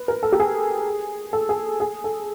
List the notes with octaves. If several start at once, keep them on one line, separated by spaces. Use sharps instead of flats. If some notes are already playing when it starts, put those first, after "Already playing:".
Already playing: B4
A#4
A4
G4
G#4
A4
G#4
G#4
A4